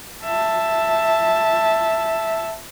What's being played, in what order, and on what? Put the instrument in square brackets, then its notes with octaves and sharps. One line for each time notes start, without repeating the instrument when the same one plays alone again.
[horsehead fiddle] E5 A5